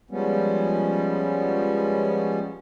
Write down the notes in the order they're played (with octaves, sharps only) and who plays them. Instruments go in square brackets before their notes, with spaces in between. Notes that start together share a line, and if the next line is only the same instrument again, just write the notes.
[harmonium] F3 G3 G#3 B3 C#4